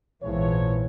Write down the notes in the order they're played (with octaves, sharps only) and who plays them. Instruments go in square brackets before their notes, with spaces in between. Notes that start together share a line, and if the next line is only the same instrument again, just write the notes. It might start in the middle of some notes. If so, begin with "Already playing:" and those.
[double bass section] A#1 G#2 E3 [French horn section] E2 F3 C#5